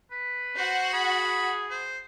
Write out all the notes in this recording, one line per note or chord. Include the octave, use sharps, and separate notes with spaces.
B4
F#4 C5 F#5
G#4 B5
C5